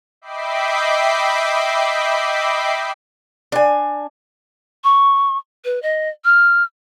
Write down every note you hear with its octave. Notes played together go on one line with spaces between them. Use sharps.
D#5 E5 G5 B5 D6 C7
D4 G#5
C#6
B4
D#5
F6